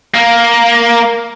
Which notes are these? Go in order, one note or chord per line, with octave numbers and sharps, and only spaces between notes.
A#3